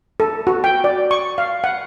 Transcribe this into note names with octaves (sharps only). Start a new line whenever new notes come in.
A4
F#4
G5
D5
C#6
F5
F#5